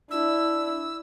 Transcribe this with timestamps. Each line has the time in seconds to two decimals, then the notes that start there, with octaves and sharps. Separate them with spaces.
0.11 D4 E4 E6